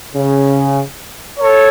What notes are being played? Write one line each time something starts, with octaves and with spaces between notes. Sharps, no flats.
C#3
A4 C#5